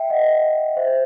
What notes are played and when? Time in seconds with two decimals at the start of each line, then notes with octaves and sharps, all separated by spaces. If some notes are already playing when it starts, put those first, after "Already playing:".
Already playing: E5 G5
0.10 D#5 F#5
0.76 C5 E5